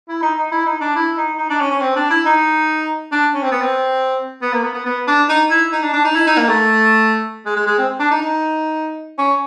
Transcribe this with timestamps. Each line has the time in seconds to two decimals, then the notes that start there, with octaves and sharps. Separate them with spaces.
0.09 E4
0.22 D#4
0.38 D#4
0.52 E4
0.66 D#4
0.81 D4
0.95 E4
1.17 D#4
1.38 D#4
1.50 D4
1.60 C#4
1.71 C#4
1.82 C4
1.96 D4
2.10 E4
2.26 D#4
3.12 D4
3.34 C#4
3.43 C4
3.52 B3
3.62 C4
4.42 B3
4.53 A#3
4.63 B3
4.74 B3
4.86 B3
5.07 D4
5.29 D#4
5.50 E4
5.72 D#4
5.82 D4
5.93 D4
6.04 D#4
6.15 E4
6.27 D#4
6.38 A#3
6.48 A3
7.45 G#3
7.56 G#3
7.66 G#3
7.78 C4
8.00 D4
8.11 D#4
8.21 D#4
9.18 C#4